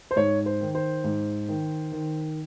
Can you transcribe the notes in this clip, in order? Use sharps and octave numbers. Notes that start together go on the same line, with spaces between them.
C5
G#2 C#5
C5
D#3
C5
G#2
D#3
D#3